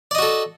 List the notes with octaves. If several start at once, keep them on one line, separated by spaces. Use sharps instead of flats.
F#4 A4 D5 D#5